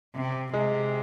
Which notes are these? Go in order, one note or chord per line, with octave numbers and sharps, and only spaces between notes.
C3
C3 G#3